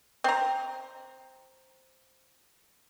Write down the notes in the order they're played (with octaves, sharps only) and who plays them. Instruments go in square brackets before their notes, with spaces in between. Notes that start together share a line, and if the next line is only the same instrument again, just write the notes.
[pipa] C4 A#5